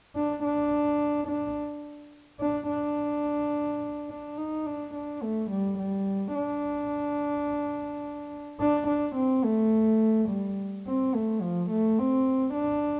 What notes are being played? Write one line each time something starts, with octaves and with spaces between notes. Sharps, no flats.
D4
D4
D4
D4
D4
D4
D#4
D4
D4
A3
G3
G3
D4
D4
D4
C4
A3
G3
C4
A3
F3
A3
C4
D4